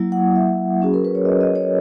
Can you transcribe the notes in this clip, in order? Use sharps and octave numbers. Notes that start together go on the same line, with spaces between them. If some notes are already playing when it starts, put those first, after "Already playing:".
Already playing: F#3 A#3 E4
F#5
E5
F#3 C#4 F#4 G#4
A#4
B4
C#5
D#5
D#5
C#5